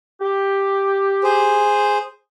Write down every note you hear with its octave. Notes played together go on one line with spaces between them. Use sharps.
G4
G#4 C5